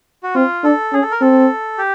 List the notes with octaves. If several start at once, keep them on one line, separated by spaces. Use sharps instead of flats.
F#4
C4 F4
D4 A4
C#4 G#4
A4
A#4
C4 A4
G4